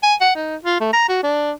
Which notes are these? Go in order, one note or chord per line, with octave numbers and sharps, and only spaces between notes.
G#5
F#5
D#4
F4
A3
A#5
F#4
D4